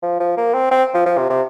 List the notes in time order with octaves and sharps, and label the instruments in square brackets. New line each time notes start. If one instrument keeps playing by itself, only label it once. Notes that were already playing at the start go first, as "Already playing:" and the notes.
[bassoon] F3
F3
A#3
C4
C4
F3
F3
C3
C3